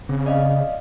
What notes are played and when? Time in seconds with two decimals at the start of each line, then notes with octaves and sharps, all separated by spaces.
0.09 C#3 C4
0.26 D5 D#5 F5